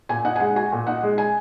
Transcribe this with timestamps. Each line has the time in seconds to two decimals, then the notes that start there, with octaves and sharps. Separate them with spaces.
0.09 A#2 G#5
0.25 D#4 F#5
0.36 G#5
0.40 G#3 F#5
0.56 F#4 G#5
0.72 A#2
0.87 D#4 F#5
1.03 G#3
1.18 G#5